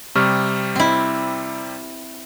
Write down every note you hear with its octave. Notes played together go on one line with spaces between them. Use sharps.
C3 G3 G4 C#6 F6
C4 E4